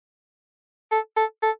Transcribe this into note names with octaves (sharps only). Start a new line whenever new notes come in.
A4
A4
A4